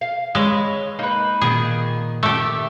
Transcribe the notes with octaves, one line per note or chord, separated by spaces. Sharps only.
F5
G#3 B4 C#5
A#3 D#4 B4
A#2 D#3 G#4
A3 G4 E5